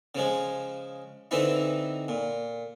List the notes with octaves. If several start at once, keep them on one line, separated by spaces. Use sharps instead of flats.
C#3 F3 G#3
D3 E3 C4 D#4 E4
A#2